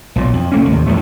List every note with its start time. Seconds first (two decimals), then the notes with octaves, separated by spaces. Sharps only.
0.16 B1 A#2
0.33 F2
0.52 C2 A3 A#3 C#4
0.71 D#2 A2 C3
0.87 F#2 A2 F3 A3